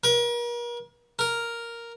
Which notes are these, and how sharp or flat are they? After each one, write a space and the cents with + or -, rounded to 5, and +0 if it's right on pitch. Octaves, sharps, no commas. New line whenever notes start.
A#4 +40
A#4 +0